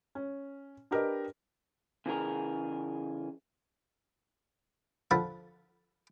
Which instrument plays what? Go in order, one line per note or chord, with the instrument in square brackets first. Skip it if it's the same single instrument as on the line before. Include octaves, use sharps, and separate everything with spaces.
[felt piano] C#4
D4 G4 A#4 B4 D#5
[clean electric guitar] C#3 E3 G#4 A#4
[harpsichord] D3 F3 A4 F#5 A5 B5